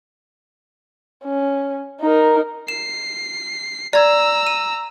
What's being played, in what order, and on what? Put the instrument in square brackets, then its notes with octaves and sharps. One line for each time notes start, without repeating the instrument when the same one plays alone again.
[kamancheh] C#4
D#4 A#4
[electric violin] C7 [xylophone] E7
[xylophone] D5 G#6 [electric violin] A#5 E6
[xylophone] D#7